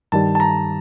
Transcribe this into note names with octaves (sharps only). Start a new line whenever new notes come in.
G2 D#3 G3 A5
A5
A#5